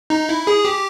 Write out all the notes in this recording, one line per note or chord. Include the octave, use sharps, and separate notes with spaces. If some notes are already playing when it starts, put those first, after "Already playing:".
D#4
E4
G#4
G4